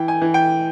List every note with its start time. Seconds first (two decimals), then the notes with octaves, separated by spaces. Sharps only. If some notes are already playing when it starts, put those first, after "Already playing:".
Already playing: E3 G5
0.08 G#5
0.21 E3
0.34 G5